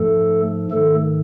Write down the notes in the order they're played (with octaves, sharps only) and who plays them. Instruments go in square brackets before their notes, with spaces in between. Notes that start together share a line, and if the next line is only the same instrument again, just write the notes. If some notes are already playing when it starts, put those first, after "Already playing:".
Already playing: [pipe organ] G#2 F3 A3 A4
G#2 D#3 A3 A4